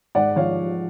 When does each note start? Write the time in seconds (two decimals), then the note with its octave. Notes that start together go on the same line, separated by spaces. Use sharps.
0.15 G#2 D5 F#5
0.36 F3 C#5 F5